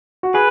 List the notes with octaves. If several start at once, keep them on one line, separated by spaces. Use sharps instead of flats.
F#4
G#4 B4